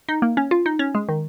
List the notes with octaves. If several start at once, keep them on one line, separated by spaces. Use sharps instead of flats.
D#4
A#3
C#4
F4
D#4
C#4
G#3
D#3